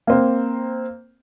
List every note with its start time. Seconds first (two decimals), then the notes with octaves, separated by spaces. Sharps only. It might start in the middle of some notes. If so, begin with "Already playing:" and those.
0.07 A#3 C4